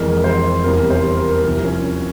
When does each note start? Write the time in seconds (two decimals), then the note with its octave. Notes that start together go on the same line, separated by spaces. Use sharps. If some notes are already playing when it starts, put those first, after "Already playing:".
Already playing: F2 E3 G#3 A#4
0.24 C5
0.64 E2 C3 G3 A#4
0.90 C5
1.17 A#4
1.43 C2 C3 F3 A#4
1.64 C#4